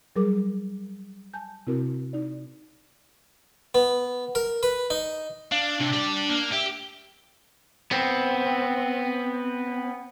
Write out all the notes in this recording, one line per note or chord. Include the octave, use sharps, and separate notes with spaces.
F#3 G3 G#4 A#4 D6
G#5 A5 G6
C3 C4 E4 F#4 A#4
D#4 D5
B3
A#4
B4
D#4
D4 F5
C3 D4
G4 D5
A#3
G4 E5
B3 C4